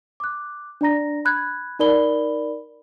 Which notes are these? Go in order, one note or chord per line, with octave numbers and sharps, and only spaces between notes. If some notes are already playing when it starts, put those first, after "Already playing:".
D6 F#6
D4 D5 A#5 A#6
B5 F#6 G#6
D#4 A#4 D5 B5 G7